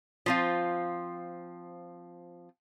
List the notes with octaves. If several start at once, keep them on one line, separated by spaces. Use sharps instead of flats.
F3 C4 F4